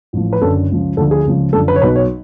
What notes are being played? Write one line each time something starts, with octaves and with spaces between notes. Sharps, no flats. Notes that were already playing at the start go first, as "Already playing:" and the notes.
A1 A2 F3
B4
F#1 F#2 D3 A4
C#2 C#3 F3
D2 D3 F3 A4
G#4
C#2 C#3 F3
F#1 F#2 D3 F3 A4
B4
C#5
B1 B2 F#3 B4
C#5